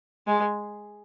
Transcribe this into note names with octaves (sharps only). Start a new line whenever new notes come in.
G#3